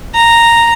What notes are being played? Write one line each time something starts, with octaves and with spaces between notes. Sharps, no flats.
A#5